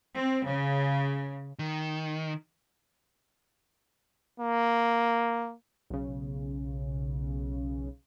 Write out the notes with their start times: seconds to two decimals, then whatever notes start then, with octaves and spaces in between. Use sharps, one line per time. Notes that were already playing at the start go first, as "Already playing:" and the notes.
0.16 C4
0.47 C#3
1.59 D#3
4.40 A#3
5.90 B1 C#3